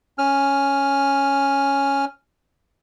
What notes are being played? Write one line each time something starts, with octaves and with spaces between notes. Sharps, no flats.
C#4 F6